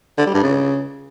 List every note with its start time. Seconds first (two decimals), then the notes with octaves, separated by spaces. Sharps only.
0.18 D3
0.26 G3
0.35 G2
0.43 C#3